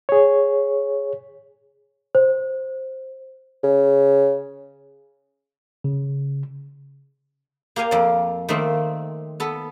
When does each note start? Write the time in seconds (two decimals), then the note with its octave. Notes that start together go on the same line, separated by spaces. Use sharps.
0.09 G#4 C#5
2.15 C5
3.64 C#3
5.84 C#3
7.76 A#3 G4 A#4 F5 G#5
7.91 F2 D5
8.49 D#3 A3 A#3 C4
9.40 B3 A4